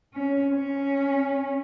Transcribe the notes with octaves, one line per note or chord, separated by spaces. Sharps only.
C#4
C#4